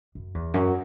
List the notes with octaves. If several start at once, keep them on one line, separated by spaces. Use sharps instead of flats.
F#2
E2
F#2